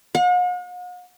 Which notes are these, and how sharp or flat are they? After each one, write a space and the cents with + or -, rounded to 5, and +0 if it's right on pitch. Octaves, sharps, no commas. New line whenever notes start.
F#5 -45